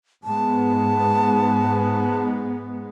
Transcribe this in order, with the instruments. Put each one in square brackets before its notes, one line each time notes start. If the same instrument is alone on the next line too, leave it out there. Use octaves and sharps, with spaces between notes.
[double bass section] G#2 G#3 B3 [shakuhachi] A5